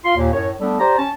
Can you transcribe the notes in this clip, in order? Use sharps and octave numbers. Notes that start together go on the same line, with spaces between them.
F4 C6
D#2 A#2
F#2 A2 C#5
G3 A3 B3 D4 A4
G4 C5 D5 A#5
C#4 A5